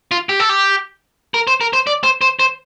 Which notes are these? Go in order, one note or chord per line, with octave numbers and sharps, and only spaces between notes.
F4
G4
A4
G4
A#4
C5
A#4
C5
D5
C5
C5
C5